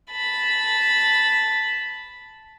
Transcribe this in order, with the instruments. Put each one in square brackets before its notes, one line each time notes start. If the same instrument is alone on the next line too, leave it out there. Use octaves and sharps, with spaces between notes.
[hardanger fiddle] A5 B5